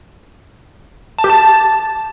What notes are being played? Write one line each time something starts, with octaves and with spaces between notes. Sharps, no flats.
A5
G4
A5